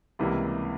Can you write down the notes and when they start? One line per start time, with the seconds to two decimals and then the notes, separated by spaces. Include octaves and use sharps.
0.19 C#2 C3 E3 G3 A#3